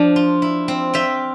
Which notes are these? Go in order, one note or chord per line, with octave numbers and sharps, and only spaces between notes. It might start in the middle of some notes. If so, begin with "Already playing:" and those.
Already playing: F3 D4
F4
E4
C4
F4 E5 G5